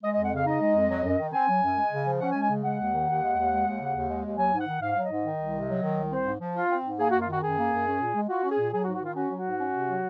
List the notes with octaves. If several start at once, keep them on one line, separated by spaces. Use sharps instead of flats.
G#3 D#5
F2 D#5
F#5
C#3 F5
D#4 D#5
G#3
F2
F#3
F#2
D#3
C4 G#5
F#3
F#2
G#3
C#3
F3
C#4 F#5
G#5
G#3
G#5
C#3
G#3 F#5
D#2
D#3
D#2
G#3
D#2
G#3
D#2
C#3
D#2
G#3
D#2
F#3 G#5
G#2
F#5
D#3
G#2 F5
F#3
D#5
G#2
D#3
C2
C3
F#3
D#3
C2
C4 C5
G#2
F3
F4
C4
G#2
A#3 G#4
F#2 F#4
F4
D#3 F#4
F#2 G#4
A#3
F#2
C#4
A#2
G#3
F4 F#4
C#4
G#4
A#2
F#3 G#4
F#4
G#2
F#4
D#3 F4
C#4 F#4
F#3
F#4
G#2
C#4
C3
F#3